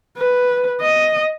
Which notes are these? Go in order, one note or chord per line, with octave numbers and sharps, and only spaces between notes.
B4
D#5